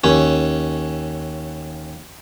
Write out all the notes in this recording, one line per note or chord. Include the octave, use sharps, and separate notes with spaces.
D#2 C#4